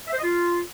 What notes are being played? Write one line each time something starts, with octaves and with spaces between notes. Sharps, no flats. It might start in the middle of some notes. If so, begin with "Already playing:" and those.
E5
C5
D#5
F4